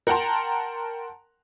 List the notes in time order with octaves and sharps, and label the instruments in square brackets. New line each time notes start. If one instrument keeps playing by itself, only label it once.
[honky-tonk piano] A#4 F#5 G5 A5 A#5 C6